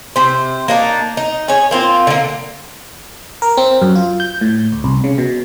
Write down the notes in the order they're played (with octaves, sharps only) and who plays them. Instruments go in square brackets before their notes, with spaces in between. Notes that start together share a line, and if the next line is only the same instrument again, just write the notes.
[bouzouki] C3 C5
A#3 D4 D#4
D#4
G#4 C#5
A#3 C4 F4
D3 A#3
[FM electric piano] A#4
C4
F#2
F4
G6
A2
D2
C2
C#3
B2